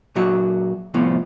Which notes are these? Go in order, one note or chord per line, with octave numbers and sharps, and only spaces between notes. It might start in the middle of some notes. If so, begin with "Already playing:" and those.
A#2 F#3 F#4
C2 F2 A2 F3 B3